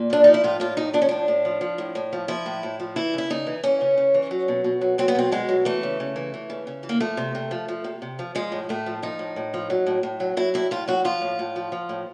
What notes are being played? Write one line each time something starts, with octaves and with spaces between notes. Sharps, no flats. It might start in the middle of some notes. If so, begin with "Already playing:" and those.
Already playing: A#2
F3 D4
F3 D#4
E4
A2 F4
A2 F4
F3 D#4
F3 D4
C#4
A2 D4
A2
F3
F3
A2
A2
F3
F3 E4
A2
A2
F3
E3 E4
C#3 E4
C#3 D#4
E3
E3 C#4
C#3
C#3
E3
F#3
B2
B2
F#3
F#3 C4
B3
B2 C4
B2 G#3
F#3
E3 A3
C#3
C#3
E3
E3
C#3
C#3
E3
A#3
F3 A3
C3
C3
F3
F3
C3
C3
F3
F3 G#3
A2
A2 A3
F3
F3 D#4
A2
A2
F3
F#3
A2
A2
F#3
F#3 E4
A2 E4
A2 F4
F#3 F#4
F3 F4
A2
A2
F3
F3
A2